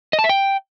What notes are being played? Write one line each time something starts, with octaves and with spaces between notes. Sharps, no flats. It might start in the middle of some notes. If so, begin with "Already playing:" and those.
D#5
A5
E5
G5